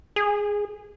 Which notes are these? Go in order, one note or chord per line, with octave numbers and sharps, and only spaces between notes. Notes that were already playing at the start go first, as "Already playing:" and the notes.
G#4